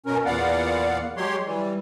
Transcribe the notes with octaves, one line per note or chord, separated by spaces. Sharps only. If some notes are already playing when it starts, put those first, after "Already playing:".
B2 C#4 A#4
E2 A#2 B3 D5 F5 F#5
F#3 G#3 G4 C#5 C6
E3 G3